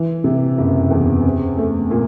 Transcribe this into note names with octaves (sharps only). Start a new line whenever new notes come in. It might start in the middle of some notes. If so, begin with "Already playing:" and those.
Already playing: E3
C3
F#1
E2
C4
A3
A#2